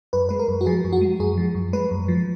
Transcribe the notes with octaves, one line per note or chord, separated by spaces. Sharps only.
F#2 B4
G#3 B4
A#4
F#2
F#4
F3 G#4
F#2
F#4
G#3
F#2 G#4
F3
F#2
G#3 B4
F#2
F3